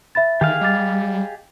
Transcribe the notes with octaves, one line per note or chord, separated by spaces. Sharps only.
E5 B5 A6
D#3 G4 G#4 F5
G3 D#5 D6 A6